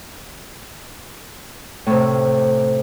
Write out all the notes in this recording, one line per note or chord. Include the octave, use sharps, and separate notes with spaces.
A2 C3